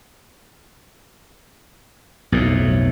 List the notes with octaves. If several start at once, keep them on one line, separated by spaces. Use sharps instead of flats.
B1 F2 A2